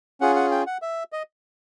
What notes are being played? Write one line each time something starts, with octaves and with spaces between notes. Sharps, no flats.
C#4 F4 G#4 F#5
F#5
G5
F#5
E5
D#5